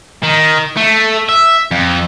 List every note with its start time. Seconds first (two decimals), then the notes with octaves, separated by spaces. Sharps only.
0.23 D#3
0.76 A3
1.29 E5
1.71 F2